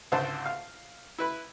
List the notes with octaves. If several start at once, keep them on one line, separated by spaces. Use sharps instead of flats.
G#1 C#2 D3 C5 A5 C6
F5
E4 B4 B5